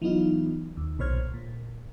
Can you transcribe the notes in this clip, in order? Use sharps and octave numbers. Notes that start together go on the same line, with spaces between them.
E3 F#3 B3 D#4 F4
D#2
B1 A#2 C5 C#5 F6 G#6
A#2